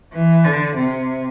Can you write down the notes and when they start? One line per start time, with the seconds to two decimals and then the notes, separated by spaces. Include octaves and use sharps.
0.14 E3
0.45 D3
0.75 C3